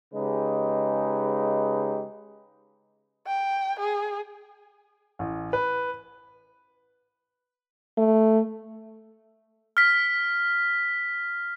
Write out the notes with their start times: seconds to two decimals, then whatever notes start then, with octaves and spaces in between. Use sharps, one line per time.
0.14 C#3 G#3 D#4 G4 B4
3.27 G5
3.79 G#4
5.19 A1
5.53 B4
7.98 A3
9.77 F6 B6